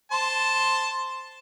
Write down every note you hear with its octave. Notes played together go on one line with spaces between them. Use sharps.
C5 A5 C6